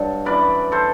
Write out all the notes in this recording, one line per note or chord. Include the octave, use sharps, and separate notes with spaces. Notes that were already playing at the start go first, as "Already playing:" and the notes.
Already playing: G2 F#3 A4
F#2 E3 B4 D5
A4 C5